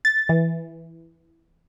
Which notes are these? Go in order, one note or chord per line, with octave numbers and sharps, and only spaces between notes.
A6
E3